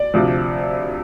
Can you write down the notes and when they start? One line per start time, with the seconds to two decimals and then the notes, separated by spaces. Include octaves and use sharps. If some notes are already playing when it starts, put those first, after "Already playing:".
Already playing: D5
0.14 D2 C3 F3